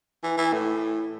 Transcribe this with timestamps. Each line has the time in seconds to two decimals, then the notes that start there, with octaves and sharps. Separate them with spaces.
0.23 E3
0.37 E3
0.53 A2